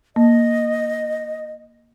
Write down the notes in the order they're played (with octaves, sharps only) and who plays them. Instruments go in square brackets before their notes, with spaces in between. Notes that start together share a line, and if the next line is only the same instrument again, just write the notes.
[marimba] A#3 [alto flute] D#5